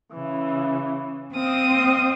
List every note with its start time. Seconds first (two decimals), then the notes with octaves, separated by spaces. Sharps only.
0.11 C#3 E3
1.34 C4 D#5 F5 D#6